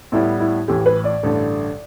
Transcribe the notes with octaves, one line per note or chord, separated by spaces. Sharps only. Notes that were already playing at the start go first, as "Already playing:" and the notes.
A2 G3 B3 E4
E4
A1 A2 E3 G4
B4
D5
A1 G2 D3 A3